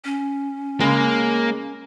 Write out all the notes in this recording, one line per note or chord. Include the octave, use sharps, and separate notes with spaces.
C#4
C#3 G#3 A#3